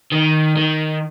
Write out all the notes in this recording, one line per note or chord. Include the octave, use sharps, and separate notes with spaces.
D#3
D#3